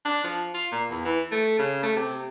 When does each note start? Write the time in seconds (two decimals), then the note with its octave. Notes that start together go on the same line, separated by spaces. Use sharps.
0.05 D4
0.24 F3
0.54 F4
0.72 A#2
0.90 E2
1.05 E3
1.31 A3
1.59 C#3
1.83 A3
1.96 C3